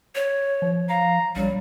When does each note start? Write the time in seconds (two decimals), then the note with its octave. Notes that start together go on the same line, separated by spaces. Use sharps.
0.15 C#5
0.62 F3
0.89 F5 A#5
1.36 A#1 F#3 G3